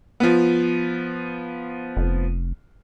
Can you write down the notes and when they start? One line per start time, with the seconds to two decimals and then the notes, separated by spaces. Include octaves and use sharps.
0.20 F3 B3
1.97 F1